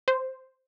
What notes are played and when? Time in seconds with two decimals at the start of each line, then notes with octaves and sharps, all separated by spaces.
0.08 C5